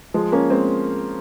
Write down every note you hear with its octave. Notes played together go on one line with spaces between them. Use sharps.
F3 G#3
A#3 C#4
G#3 C4